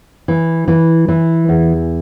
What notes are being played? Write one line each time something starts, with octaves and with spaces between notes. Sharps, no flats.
E3
E3
E3
E2